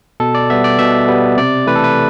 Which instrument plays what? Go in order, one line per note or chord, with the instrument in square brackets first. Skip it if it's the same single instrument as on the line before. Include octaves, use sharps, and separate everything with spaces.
[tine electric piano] B2 A4
D5
G3 B3 E5
D5
B2 E5
G3 B3
C3 D5
E3 A3 B4
A4
B4